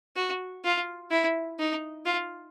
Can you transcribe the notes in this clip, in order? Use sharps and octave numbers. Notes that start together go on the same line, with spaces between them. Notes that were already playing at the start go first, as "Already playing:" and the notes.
F#4
F4
E4
D#4
F4